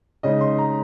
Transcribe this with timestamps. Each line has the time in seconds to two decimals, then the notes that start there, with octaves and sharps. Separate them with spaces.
0.23 C#3 G#3 D#4 D#5
0.41 C6
0.58 A#5